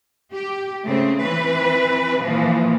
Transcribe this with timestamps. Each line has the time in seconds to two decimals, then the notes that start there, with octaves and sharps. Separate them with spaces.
0.33 G4
0.85 C#3 A3 C4
1.22 E3 C4 B4
2.23 A#2 E3 F3